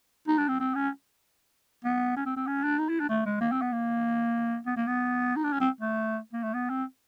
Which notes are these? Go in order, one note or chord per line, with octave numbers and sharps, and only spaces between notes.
D#4
D4
C4
C4
C#4
B3
C#4
C4
C4
C#4
D4
D#4
E4
D4
A3
G#3
A#3
C4
B3
A#3
B3
A#3
B3
D#4
D4
C#4
C4
A3
A#3
A3
B3
C4